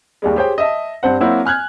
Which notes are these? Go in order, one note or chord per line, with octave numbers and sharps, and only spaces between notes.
D#2 G3 G#3
G4 G#4 C5 C#5 G5
D#5 E5 A5
G2 C4 C5 F#5
F#3 A#3 C4 E4 F#4
G#5 F6 F#6 G#6